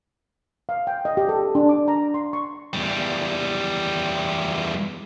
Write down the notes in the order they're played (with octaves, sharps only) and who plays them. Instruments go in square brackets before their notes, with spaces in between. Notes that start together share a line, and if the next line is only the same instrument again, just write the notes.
[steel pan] F5
G5
D#5
G4
A4
D4
D6
A#5
C6
C#6
[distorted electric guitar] E2 G3